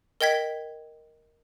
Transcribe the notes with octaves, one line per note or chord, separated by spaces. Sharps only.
A#4 D#5 G5 G#6 B6